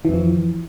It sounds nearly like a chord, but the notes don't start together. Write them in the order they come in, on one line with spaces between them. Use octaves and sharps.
E3 F2 F3